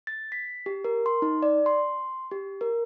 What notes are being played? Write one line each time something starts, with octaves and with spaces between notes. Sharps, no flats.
A6
B6
G4
A#4
C6
D#4
D5
C6
G4
A#4